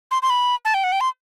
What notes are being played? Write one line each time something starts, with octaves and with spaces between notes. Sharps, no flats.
C6
C6
B5
A5
G5
F#5
G5
C6